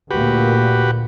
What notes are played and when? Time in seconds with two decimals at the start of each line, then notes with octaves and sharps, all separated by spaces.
0.11 D2 A#2 F#4 G4 B4